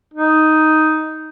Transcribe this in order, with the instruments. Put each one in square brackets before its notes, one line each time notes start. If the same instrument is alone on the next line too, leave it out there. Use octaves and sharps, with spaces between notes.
[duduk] D#4